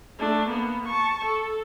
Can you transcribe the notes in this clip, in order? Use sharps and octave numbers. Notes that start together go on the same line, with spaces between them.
A3 D4
A#3 B3
A5 C#6
A4